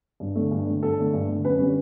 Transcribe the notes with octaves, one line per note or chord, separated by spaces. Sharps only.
G2
D3 A3
G2
D3 A3
G2 A4
D3 A3
G2
D3 A3
F#2 B4
D3 G3 C#4